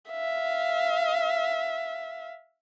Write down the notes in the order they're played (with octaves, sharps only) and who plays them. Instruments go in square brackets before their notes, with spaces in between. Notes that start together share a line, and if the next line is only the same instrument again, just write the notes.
[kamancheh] E5 F5